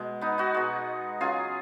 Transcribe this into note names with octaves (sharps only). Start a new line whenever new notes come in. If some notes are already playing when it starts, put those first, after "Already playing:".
Already playing: B2 G#3
B3 D#4
D#4 F#4
B2 G#3
C#3 F#3 F4 G#4